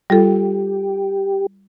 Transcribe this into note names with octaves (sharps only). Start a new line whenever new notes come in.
G3 F4 G4 A4